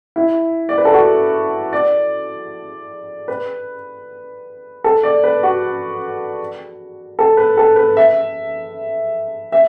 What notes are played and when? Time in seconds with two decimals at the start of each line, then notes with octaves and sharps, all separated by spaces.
0.16 E4
0.69 D5
0.78 B4
0.85 A4
0.93 F#4
1.73 D5
3.28 B4
4.84 A4
5.03 D5
5.24 B4
5.43 F#4
7.19 A4
7.37 B4
7.57 A4
7.76 B4
7.97 E5
9.52 E5